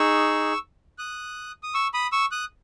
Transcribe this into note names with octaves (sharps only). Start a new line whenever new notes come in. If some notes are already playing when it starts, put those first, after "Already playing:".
Already playing: D#4 G#4 C#6 E6
D#6 F#6
D#6
C#6 E6
B5 D#6
C#6 E6
D#6 F#6